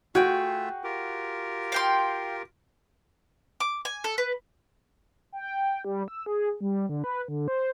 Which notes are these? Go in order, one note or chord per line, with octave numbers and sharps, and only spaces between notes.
A3 F4 F#4 G#4 E5 G5
F4 G4 A#4
F5 G5 C6
D6
G#5
A4
B4
G5
G3
E6
G#4
G3
D3
B4
D3
C5